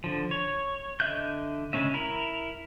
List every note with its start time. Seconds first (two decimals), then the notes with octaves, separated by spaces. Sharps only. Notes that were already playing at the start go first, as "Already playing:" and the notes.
0.04 D3 F3
0.31 C#5
1.00 D3 D#5 E5 F#6 G6
1.73 C#3 G#3 A3 C#4 E5
1.94 E4 A#4